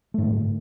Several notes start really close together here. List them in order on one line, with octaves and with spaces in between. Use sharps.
A3 G#2 D3